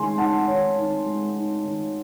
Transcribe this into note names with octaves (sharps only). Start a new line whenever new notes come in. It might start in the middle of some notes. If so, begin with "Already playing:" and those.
Already playing: D#3 G#3 G#5 C6
D#4 F#5 A5
D#3 C#5
D#3
G#3
D#4
D#3